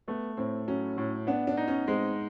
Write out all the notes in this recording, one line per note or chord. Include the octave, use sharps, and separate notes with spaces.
A3 B3
A2 C4
F#3 C#4
A2
B3 D4
D4
D#4
C#4
G#3 C4